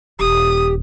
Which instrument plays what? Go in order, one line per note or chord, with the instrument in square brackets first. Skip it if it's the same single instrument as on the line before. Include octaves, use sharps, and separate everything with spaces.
[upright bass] D#1 [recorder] G4 [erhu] D#6